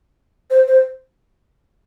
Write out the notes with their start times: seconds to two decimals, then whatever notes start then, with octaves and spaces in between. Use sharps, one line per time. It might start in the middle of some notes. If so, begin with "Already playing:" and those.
0.50 C5
0.68 C5